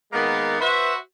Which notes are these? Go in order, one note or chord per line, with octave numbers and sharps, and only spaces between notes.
D#3 G#3 A#3 B3
F#4 B4 C5 E5